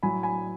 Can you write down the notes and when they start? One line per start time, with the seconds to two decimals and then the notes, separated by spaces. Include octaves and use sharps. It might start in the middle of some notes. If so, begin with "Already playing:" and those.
0.03 A2 F#3 G#5 B5
0.23 G#5 B5